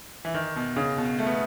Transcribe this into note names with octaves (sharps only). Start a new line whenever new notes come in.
E3
D#3
B2
C#3
B2
A3
B3